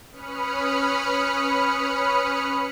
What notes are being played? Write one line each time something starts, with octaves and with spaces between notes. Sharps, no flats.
C#4 B4 B5 D#6 F6 C#7